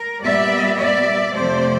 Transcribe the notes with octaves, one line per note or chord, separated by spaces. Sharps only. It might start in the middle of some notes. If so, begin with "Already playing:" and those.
Already playing: A#4
A#2 G3 B3 D5 E5
D5 E5
F2 C3 F3 A3 C5 D5